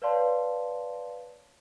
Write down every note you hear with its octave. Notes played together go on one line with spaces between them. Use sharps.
B4 C#5 D5 F5 A5 C6